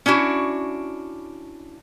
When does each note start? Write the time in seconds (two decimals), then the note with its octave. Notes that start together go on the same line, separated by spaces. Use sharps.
0.06 C#4 D4 E4 F#4